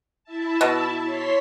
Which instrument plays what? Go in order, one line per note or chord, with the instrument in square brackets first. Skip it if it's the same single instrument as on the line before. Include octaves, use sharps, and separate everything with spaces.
[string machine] E4 E5 A5
[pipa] B2
[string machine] C#5 C6 B6